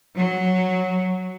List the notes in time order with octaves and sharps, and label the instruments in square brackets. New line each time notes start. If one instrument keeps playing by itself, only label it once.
[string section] F#3